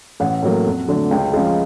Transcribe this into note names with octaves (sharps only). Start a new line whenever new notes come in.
A1 F#5
A2 F#3 A#3
F2
D3 F#3 A3
C#2 G5
C#3 F3 G#3 F5